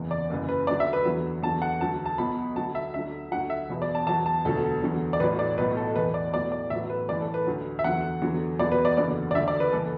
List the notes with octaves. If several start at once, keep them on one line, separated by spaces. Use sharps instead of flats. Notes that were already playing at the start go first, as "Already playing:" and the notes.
Already playing: F#1 E2 E3
D5
F#1 F#2 E3
B4
D2 D3 F#3 D5
E5
B4
E2 D3 F#3
E2 D3 F#3 A5
F#5
D2 D3 F#3 A5
A5
B1 B2 F#3 B5
D2 D3 F#3 A5
E5
D2 D3 F#3 E5
D2 D3 F#3 F#5
E5
E1 E2 B2
D5
A5
E2 B2 F#3 A5
A5
E1 D2 D3 F#3 A4
E2 D3 F#3
D5
A1 A2 F#3 B4
D5
B1 A2 F#3 B4
A4
E1 E2 E3 B4
D5
B1 A2 F#3 D5
D5
A1 A2 F#3 E5
B4
A1 A2 E3 D5
A4
B4
D2 D3 F#3
E5
E2 D3 F#3 F#5
E2 D3 F#3
E2 B2 F#3 D5
B4
D5
F#1 E2 D3 F#3 D5
D5
D2 D3 F#3 E5
D5
B4
F#1 E3 A4